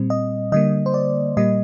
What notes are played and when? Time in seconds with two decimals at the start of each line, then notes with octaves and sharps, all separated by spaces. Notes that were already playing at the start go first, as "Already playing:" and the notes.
Already playing: A#2 G3 C4
0.10 D#5
0.52 D3 G3 A#3 D#5
0.86 C5
0.94 D5
1.37 A#2 G3 A#3 D#5